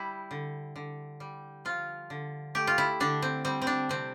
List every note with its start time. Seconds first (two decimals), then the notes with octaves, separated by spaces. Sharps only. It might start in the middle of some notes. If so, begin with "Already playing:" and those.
Already playing: G3 E4
0.31 D3
0.76 D3
1.20 G3
1.65 F3 F4
2.10 D3
2.55 A3 G4
2.67 F4
2.78 E4
3.00 D3 D4
3.22 C4
3.45 G3 C4
3.62 C4
3.67 D4
3.89 C3 C4